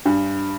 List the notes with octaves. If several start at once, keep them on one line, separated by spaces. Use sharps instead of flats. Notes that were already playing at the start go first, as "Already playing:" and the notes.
G2 D4